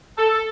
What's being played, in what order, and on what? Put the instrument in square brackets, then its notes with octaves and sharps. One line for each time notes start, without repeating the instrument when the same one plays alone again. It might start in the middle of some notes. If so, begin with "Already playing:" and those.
[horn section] A4